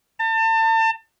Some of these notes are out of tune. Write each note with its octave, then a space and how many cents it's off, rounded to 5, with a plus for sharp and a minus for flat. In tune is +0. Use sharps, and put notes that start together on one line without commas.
A5 +35